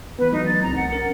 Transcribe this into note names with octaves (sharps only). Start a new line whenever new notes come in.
E3 B3 B4
E3 F#3 A3 D#4
A6
C2 C4 A#5
F#5
C#4 A#4